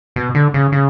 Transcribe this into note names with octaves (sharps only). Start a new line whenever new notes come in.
B2
D3
C#3
C#3